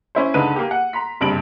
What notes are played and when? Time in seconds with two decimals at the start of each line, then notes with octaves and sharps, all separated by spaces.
0.15 C#4 E4 C5
0.34 C#2 D3 D#4 B4 D#7
0.56 A#3 G4
0.71 F#5
0.93 A#5 C6 B6
1.21 F#1 G2 C3 D7 F#7